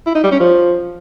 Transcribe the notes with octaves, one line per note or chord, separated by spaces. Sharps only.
E4
D#4
G3
C#4
F3